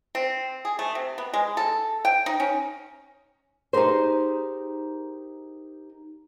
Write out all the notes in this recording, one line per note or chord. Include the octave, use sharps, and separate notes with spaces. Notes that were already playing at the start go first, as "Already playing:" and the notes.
C4
G#4
A3
C3
B3
G#3
A4
G5
D#4
C#4
D#4 G4 G#4 A#4 C5